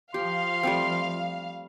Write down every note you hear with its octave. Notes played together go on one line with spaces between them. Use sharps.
F3 G4 F5 C6
G3 A3 C4